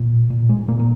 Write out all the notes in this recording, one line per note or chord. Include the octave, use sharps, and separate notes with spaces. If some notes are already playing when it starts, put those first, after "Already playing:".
Already playing: A#2
A#2
G#3
A#2 A#3
A#3